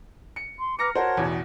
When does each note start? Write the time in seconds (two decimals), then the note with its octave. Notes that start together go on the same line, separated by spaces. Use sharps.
0.36 C#7
0.60 C6
0.79 B4 A#5 D6 F6 A#6 C#7
0.95 F#4 A#4 C5 C#5 F#5 A5
1.17 A1 E2 B2